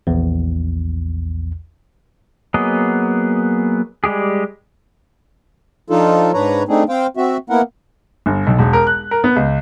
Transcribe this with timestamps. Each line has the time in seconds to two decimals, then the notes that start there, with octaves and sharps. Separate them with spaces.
0.07 A#1 E2
2.54 F#3 A#3 B3 G#4 D#5
4.04 G3 G#3 G4 G#4
5.90 F3 D4 D#4 F4 A4
6.34 G#2 D4 B4 C#5 A#5
6.68 A3 C4 D4 D#4 G#4
6.89 C4 C5 F5 G5
7.17 C4 F#4 E5
7.50 A#3 B3 E4 A#4 F#5
8.26 G1
8.47 B1
8.59 E1
8.73 A#4
8.87 F#6
9.11 A#4
9.24 B3
9.36 C#2